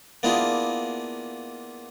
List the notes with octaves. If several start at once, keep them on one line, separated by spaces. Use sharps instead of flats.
A#3 B3 D4 E4 F4 G#4